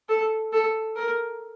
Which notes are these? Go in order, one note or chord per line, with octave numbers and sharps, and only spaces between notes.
A4
A4
A#4